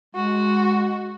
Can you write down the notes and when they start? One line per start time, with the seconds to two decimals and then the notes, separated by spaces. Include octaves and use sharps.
0.15 G#3 F#4